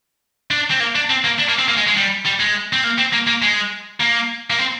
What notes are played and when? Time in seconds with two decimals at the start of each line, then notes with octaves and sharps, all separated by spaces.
0.51 D4
0.70 C4
0.80 A#3
0.95 D4
1.10 C4
1.24 A#3
1.39 D4
1.49 A#3
1.58 C4
1.68 A#3
1.77 G#3
1.87 G#3
1.97 G3
2.25 G3
2.40 G#3
2.73 C4
2.84 A#3
2.99 C4
3.13 A#3
3.27 A#3
3.42 G#3
4.00 A#3
4.50 A#3
4.58 C4